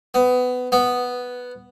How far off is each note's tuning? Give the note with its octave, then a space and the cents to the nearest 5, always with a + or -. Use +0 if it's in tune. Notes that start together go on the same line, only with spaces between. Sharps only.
B3 +20
B3 +0